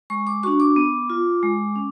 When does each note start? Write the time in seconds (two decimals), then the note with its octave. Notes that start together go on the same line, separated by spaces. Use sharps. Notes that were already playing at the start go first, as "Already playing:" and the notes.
0.10 G#3 C#6
0.27 D6
0.43 D4 F#4 C#6
0.60 D6
0.76 B3
1.10 F4
1.43 G#3
1.76 C#4